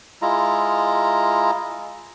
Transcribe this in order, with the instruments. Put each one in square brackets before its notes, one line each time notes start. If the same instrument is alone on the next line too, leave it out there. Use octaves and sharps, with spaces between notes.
[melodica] G#3 E4 F4 A#5